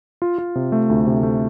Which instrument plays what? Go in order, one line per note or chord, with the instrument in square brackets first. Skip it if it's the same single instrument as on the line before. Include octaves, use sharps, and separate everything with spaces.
[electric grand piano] F4
F4
C3
A3
D2
C3
A3